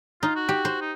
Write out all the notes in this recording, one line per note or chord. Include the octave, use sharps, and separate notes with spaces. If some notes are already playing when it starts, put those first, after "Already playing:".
D#4 F4
F#4
G4
C5
D#4